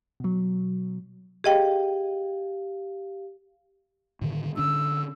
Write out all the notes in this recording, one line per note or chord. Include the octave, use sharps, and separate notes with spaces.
B2 F#3
G4 G#4 D#5 F5 G5
A2 D3 D#3
D3 C#4 D4 E6